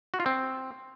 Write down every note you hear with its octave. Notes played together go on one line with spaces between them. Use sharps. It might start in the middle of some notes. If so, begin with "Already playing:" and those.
F#4
F4
C4